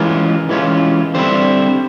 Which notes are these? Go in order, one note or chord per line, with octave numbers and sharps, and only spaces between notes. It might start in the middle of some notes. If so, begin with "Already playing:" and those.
Already playing: E3 G#3 C#4 F4 A#4
E3 G#3 C#4 F4
D3 G3 C4 E4 C5